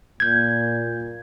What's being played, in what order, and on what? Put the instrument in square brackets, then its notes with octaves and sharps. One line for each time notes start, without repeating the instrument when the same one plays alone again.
[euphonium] A#2 [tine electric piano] G6 G#6